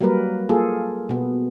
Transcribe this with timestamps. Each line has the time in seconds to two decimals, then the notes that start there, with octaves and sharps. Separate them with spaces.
0.01 F#3 G3 A#3 A#4 B4
0.49 A#3 F4 G#4 A4
1.09 B2 B3